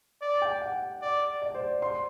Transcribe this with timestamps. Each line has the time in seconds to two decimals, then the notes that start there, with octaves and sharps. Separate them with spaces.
0.22 D5
0.42 G5
0.62 F#5
1.02 D5
1.42 D5
1.55 C5
1.82 C6